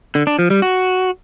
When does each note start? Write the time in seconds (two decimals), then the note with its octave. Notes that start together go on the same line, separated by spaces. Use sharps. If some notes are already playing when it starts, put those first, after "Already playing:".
0.15 D3
0.27 D4
0.39 F3
0.50 G3
0.62 F#4